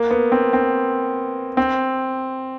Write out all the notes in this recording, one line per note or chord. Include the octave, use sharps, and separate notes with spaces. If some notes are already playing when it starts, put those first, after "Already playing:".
Already playing: A#3
B3
C4
C4
C4